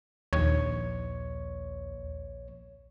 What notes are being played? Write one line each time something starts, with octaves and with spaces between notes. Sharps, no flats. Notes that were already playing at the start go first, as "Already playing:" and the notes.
A#1 D#2 C#5